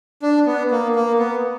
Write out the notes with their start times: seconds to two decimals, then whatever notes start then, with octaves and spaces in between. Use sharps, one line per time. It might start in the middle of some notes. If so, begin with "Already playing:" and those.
0.22 D4
0.46 B3
0.71 A#3
0.95 A#3
1.19 B3